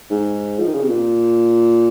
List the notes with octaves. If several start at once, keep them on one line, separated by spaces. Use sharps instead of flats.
G#2
F3
D#3
C#3
C3
A#2